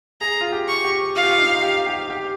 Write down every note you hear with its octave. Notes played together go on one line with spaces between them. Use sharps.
G#4 A#5
F4
G4
C#6
G4
F4 F5
G4
F4
D#4
G4
G4
G4